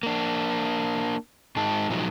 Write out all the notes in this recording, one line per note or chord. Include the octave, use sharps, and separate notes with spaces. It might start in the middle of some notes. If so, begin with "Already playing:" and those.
A#3 D4
G#2 G#3 D#4 A5
A#2 F3 F#3 G#3 D#4